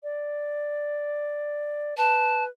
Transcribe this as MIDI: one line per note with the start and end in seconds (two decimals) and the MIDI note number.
0.03 1.97 74
1.97 2.48 71
1.97 2.44 81